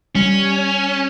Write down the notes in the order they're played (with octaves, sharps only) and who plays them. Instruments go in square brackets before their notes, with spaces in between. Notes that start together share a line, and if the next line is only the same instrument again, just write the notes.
[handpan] G3 [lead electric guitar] C#4